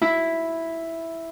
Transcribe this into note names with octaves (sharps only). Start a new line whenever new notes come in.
E4